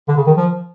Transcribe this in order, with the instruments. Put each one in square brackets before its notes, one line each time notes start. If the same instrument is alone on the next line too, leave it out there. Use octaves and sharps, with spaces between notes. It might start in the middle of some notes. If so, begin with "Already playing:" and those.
[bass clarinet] D3
C#3
D#3
F3